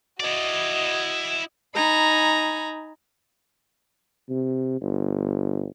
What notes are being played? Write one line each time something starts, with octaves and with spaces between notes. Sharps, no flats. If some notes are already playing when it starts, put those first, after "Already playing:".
E4 F#4 D5 D#5
D#4 G#5 A#5 B5
C3
G1